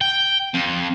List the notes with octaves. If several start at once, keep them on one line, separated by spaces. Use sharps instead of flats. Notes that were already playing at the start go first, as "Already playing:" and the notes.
G5
F2